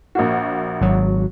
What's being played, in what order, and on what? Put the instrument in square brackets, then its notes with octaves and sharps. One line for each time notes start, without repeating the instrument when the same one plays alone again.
[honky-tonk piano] A#1 A#3 F#4
[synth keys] G#1 F#3